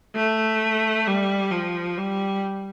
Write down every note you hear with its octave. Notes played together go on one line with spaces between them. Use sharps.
A3
G3
F3
G3